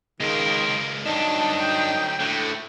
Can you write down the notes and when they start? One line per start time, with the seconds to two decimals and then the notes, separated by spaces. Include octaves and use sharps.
0.20 C#2 D#3 G#3 F4 A#4
1.06 D2 G2 F#3 D4 D#4 A5
1.60 G5
2.20 A2 D3 A3